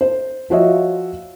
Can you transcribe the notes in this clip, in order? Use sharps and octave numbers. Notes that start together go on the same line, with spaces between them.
C5
F3 F4 F#4 C#5 D#5 E5